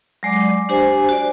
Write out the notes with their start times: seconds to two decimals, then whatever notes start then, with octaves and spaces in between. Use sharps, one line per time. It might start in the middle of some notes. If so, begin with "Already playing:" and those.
0.23 F#3 G#3 D5 D6
0.69 D4 G4 C5 G#5
1.09 F#4 D5